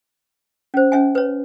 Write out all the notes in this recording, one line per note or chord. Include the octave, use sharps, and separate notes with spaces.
C#4 C5
C#4 E5 G#5
B4 C#5